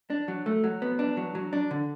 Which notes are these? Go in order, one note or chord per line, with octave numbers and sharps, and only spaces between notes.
D4
F#3
A3
F#3
B3
D4
F#3
F#3
D4
D3